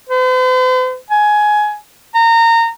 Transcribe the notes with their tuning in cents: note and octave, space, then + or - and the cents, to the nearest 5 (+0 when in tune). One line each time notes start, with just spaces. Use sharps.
C5 -45
G#5 +15
A#5 -25